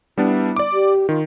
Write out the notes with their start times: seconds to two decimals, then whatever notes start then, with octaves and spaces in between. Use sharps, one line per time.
0.18 G3 B3 D4 E4
0.57 D5 D6
0.72 G4
1.09 D#3 F4